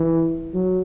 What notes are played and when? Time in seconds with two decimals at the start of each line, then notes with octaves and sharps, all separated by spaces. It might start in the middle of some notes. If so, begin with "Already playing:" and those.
Already playing: E3
0.54 F#3